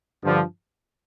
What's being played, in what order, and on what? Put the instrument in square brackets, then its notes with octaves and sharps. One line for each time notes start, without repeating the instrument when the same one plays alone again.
[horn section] G2 D3 F3